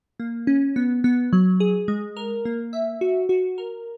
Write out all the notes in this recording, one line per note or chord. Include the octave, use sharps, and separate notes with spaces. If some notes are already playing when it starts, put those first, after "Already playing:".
A#3
C#4
B3
B3
F#3
G#4
G#3
A#4
A#3
E5
F#4
F#4
A#4